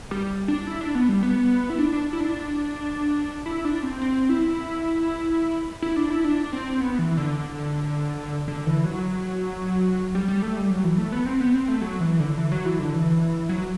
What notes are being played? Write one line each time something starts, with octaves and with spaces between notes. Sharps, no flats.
G3
D4
E4
D4
B3
G3
B3
E4
D4
D4
E4
D4
E4
D4
C4
C4
E4
E4
D4
E4
D4
C4
B3
E3
D3
D3
E3
F#3
G3
G3
A3
G3
F#3
E3
A3
B3
C4
B3
C4
A3
F#3
E3
D3
E3
F#3
E3
D3
E3
F#3